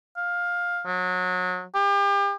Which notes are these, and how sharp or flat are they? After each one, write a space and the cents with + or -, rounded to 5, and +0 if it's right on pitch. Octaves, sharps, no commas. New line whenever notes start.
F5 +10
F#3 -25
G4 +35